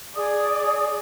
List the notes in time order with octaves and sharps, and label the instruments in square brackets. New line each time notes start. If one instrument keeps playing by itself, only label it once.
[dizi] G#4 [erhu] D5 [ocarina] D#6